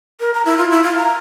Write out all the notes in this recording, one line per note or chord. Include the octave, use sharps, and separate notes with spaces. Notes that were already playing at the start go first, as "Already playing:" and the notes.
A#4
A#5
E4
F4
E4
F5
A#5